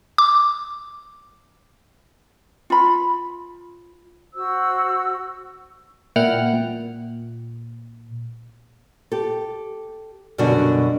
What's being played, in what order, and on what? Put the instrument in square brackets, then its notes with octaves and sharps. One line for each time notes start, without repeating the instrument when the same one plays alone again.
[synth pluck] D6
[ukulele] F4 B5
[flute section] F#4 C5 E6
[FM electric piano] A#2 E4 F#5 G5 F6
A#2
[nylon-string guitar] G4 A4
F#2 B2 D3 G3 D4 F#4